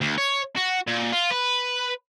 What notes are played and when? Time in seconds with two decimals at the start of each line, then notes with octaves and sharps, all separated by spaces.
0.01 D2
0.18 C#5
0.56 F#4
0.87 A#2
1.13 F4
1.31 B4